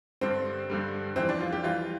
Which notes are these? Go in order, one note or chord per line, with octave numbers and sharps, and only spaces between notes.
G2 D3 G3 C4
G2 D3 G3
F2 E3 G3 C4
D4
F4
G4
F2 E3 G3 F4